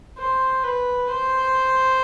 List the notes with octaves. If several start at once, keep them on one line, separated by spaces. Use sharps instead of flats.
C5
B4
C5